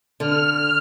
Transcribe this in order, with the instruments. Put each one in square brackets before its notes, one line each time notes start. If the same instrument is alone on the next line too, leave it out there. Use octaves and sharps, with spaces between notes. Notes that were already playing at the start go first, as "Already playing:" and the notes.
[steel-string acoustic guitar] D3 [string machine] F6